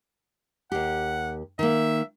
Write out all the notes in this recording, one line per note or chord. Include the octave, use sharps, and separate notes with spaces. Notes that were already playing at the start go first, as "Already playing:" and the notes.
D#2 G4 F#5
D#3 A#3 E5